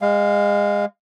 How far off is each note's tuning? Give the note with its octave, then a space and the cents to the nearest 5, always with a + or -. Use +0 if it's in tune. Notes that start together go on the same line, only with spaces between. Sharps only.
G#3 -25 F5 +0